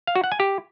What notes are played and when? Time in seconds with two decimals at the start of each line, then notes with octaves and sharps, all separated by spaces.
0.07 F5
0.15 F#4
0.24 F#5
0.32 G#5
0.40 G4